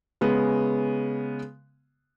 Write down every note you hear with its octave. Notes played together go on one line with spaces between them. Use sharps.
C#3 G#3 B3